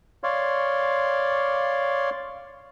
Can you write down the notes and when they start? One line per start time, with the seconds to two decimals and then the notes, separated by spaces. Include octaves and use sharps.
0.23 C#5 D5 F5 C6